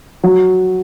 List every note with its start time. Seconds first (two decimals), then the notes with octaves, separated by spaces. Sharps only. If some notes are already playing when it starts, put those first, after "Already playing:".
0.23 F#3